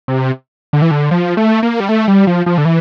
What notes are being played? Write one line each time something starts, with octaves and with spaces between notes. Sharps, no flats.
C3
D3
E3
D3
F3
A3
A#3
G3
A3
G3
F3
F3
D3
E3